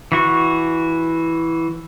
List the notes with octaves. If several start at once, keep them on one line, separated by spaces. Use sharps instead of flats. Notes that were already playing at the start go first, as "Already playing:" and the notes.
E3 F#4 C#6